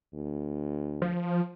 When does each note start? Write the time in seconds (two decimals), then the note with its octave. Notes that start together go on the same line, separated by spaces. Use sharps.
0.14 D2
1.02 F3